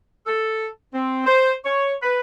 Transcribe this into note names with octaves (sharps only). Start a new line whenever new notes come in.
A4
C4
C5
C#5
B4